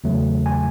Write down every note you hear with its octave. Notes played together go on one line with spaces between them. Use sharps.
E2 C#3 F#3 A3
G#5